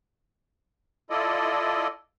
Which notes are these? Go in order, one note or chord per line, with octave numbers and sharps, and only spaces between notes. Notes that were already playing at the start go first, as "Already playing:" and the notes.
E4 F4 A4 D5 D#5